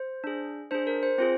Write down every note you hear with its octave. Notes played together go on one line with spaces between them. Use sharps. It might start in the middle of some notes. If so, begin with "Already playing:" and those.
Already playing: C5
D4 G#4
D4 G#4 C5
A#4
C5
C4 F4 G#4 C5